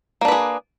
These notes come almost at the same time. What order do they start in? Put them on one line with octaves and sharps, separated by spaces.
A#3 D4 B4 G#4